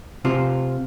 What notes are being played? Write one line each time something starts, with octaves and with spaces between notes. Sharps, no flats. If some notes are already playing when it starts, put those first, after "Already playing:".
C3 F4 C5